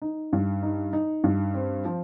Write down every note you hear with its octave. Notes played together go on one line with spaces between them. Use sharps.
D#4
G2
D#4
D#4
G2
C4
F3